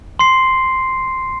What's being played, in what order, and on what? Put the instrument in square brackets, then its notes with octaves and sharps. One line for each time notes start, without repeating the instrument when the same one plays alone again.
[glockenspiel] C6 C7